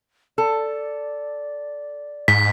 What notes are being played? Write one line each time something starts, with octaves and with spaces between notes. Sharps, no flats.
A4 D5
G#2 B6